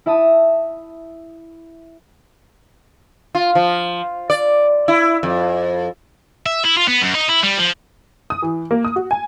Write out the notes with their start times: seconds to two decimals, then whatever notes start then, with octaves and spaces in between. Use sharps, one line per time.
0.06 E4 E5 A5 D#6 D#7
3.35 F4
3.55 F3
4.30 D5
4.88 E4
5.23 F2
6.46 E5
6.64 E4
6.77 F4
6.88 B3
7.01 F#2
7.14 D#4
7.29 E4
7.43 G3
7.58 F3
8.30 D#6
8.42 E3
8.71 A#3
8.85 D#6
8.96 F#4
9.11 G#5